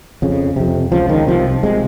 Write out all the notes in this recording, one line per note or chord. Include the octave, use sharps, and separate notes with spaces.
F2 C#3
F2 C3
C#2 C#3 F3
D#3
C2 C3 F3
C3 G#3